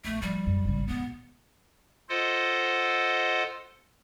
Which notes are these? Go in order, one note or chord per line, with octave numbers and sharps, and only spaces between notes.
A#1 A3 B3
A2 F3 G3
F#2
G#1 C#3
D#3 G#3 B3
B2
F4 A4 C5 D#5 F#5